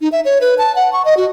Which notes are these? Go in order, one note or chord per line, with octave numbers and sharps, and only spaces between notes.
D#4
E5
C#5
B4
A5
F#5
C#6
D#5
F#4